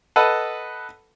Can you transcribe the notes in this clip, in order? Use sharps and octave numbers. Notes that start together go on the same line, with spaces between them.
A4 B4 D#5 F#5